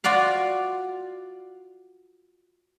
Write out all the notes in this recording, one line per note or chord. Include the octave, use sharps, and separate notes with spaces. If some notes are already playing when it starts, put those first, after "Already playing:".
F4 F#4 D5 F5